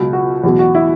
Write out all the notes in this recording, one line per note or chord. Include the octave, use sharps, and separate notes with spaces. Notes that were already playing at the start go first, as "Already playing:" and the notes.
Already playing: C#2 B2 F#3
F#4
E2 B2 F#3 F#4
F#4
E4